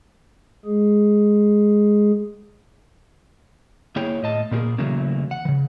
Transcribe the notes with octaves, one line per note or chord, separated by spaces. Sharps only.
G#3 G#4
A#3 E4 G#4 C#5 G5
A2 D#5 A5
A#2 A#3 D#4 G4 G#4 A#4
C#3 E3 F#3 A3 A#3 C#4
F#5
C#3 E3